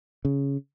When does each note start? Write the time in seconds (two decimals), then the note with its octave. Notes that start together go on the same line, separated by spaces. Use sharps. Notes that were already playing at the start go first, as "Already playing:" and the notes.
0.25 C#3